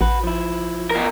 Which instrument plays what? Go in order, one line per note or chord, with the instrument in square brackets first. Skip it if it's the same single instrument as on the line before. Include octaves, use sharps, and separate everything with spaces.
[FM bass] A1 [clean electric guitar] F#4 B4
[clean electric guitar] F3 E4
[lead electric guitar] B2 A#4